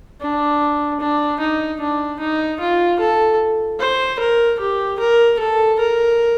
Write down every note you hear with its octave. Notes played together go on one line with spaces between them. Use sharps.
D4
D4
D#4
D4
D#4
F4
A4
C5
A#4
G4
A#4
A4
A#4